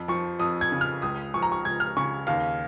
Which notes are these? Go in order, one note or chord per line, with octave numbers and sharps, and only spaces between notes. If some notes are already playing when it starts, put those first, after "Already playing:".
Already playing: F2
F3 C#6
F2 D#6
G#6
C#3
F6
C#2 D#6
F3 C#6
A#5
C#6
C#2 G#6
F6
C#3 C#6
D#2 F5